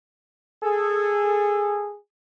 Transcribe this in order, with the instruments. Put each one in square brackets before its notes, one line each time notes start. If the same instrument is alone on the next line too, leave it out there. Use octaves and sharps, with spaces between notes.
[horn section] G#4 A4